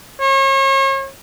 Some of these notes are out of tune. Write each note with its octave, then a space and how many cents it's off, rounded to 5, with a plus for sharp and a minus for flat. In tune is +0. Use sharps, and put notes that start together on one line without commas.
C#5 -40